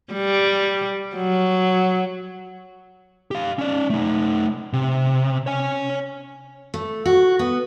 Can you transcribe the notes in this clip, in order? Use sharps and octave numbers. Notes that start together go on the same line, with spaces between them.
G3
F#3
G4 F5
C#4 D5
A3 D#4
C3
C#5 G#5
A3
F#4
B3